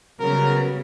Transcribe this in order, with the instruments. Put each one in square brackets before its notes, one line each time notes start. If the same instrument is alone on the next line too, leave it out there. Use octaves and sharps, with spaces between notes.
[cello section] C#3 G3 B3 [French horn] F#3 [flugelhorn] A#4